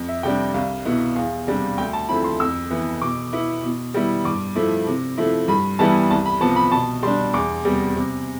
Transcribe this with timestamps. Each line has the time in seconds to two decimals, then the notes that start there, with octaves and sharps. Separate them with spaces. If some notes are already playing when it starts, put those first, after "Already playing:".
Already playing: F2
0.09 E5
0.23 C3 G3 D4 G5
0.54 C2 F5
0.85 B2 B3 E4
1.16 E2 F5
1.47 C3 G3 D4
1.78 D2 G5
1.93 A5
2.08 D3 F3 C4 E4 B5
2.24 C6
2.40 F2 E6
2.71 E3 B3 E4
3.02 B2 D6
3.33 B3 E4
3.63 B2
3.94 G3 B3 E4
4.24 G2 D6
4.55 F3 A3 E4
4.87 C3
5.17 F3 A3 E4
5.48 G2 B5
5.79 E3 G3 B3 E4 A5
6.10 C2 A5
6.26 B5
6.40 C3 F3 B3 A5
6.56 B5
6.71 B2 A5
7.03 G3 D4 C6
7.34 E2 D6
7.64 C3 G3 B3
7.95 C3